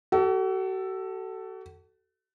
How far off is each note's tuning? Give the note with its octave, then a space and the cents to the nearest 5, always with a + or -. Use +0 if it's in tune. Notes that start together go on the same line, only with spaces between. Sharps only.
F#4 +40 A4 +5